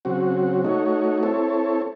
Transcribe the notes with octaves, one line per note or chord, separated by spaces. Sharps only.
C#3 F#3 C4 F#4
A3 D#4 F#4 C#5
C4 E4 A4 C#5